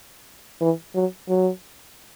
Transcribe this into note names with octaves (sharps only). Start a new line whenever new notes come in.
E3
F#3
F#3